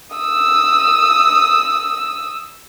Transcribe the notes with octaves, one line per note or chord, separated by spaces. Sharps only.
D#6 E6